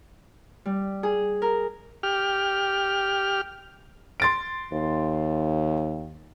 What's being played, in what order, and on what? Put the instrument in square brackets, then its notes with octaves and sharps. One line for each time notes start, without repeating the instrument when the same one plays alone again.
[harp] G3
G#4
A#4
[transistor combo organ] G4 F6
[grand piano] C6 A6 D7
[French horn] D#2